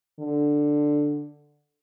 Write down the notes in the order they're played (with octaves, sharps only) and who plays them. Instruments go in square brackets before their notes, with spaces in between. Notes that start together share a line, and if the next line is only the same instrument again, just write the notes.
[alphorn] D3